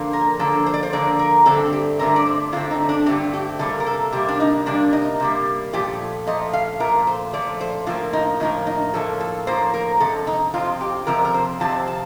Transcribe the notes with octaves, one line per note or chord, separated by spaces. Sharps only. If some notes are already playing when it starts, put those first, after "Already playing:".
Already playing: D3 F3 A#3
A#4
D3 F3 A#3 A4
C5
D5
C5
D3 F3 A#3 D5
A#4
G2 D3 A3 C4 A4
G4
G2 D3 A3 C4 A#4
D5
C5
G2 D3 A3 C4 F4
D#4
D4
G2 D3 A3 C4 G4
G4
C3 G3 A#3 A4
A#4
A4
C3 G3 A#3 G4
D4
D#4
C3 G3 A#3 D4
D#4
C3 G3 A#3
A#2 F3 A3 G4
A#2 F3 A3 D#5
F5
A#2 F3 A3 A#4
C5
A#2 F3 A3 D5
C5
A2 F3 A#3 F4
D#4
A2 F3 A#3 D#4
D#4
A2 F3 A#3 A4
A4
A2 F3 A#3 C5
A#4
F2 C3 A4
D#4
F2 C3 F3 C4 F4
G4
F2 C3 F3 C4 A#4
A#4
C5
F2 C3 F3 C4 A5
A5